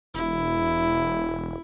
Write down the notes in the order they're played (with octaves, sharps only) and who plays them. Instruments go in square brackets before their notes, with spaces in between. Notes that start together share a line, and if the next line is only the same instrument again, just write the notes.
[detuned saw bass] E1 [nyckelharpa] E4